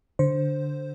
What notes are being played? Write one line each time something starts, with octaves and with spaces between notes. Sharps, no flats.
D3 C5